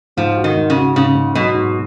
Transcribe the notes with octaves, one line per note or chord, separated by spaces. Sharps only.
G#2 F3
F#4
D#3
G#2
C#3
F#4
G#2 C#3
G#2
B2 F#3
G#2